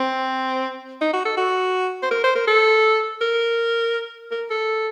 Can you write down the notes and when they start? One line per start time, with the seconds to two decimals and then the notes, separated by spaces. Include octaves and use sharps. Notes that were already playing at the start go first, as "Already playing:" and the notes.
Already playing: C4
1.01 D#4
1.13 F#4
1.25 A4
1.37 F#4
2.03 C5
2.11 A#4
2.24 C5
2.35 A#4
2.47 A4
3.21 A#4
4.31 A#4
4.50 A4